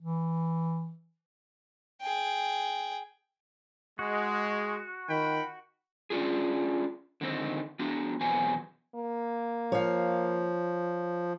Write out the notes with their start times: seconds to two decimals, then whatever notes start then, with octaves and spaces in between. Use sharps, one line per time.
0.01 E3
2.02 G#4 G5
3.99 G#3 F#4
5.09 D#3 F4 G5 B5
6.10 C#4 D4 F4 G#4
7.21 D3 D#3 C4 D#4
7.79 B3 D4 F#4
8.21 E2 B2 F#3 B3 C4 G#5
8.95 A#3
9.72 F3 C#5 F5